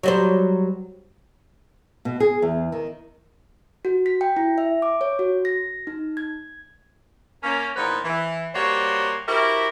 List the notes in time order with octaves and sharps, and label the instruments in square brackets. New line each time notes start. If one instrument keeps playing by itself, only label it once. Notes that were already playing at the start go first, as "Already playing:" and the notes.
[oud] F#3 G3 C5
[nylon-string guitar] B2
G#4
E2
D#3
[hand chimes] F#4
B6
G5
E4
E5
D6
C#5
F#4
A#6
D#4
G#6
[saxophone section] A#3 C#4
E2 A#2 F3 B3 D#4 B4
E3
G3 A#3 F#4 C5 C#5
E4 F#4 G4 A#4 C5 E5